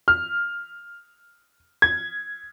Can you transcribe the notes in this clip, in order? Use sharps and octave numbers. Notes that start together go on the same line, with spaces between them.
F6
G#6